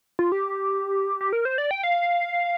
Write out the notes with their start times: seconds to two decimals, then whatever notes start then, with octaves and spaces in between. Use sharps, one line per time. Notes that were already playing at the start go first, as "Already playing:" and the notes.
0.19 F4
0.32 G4
1.21 G4
1.33 A#4
1.45 C5
1.58 D5
1.71 G5
1.84 F5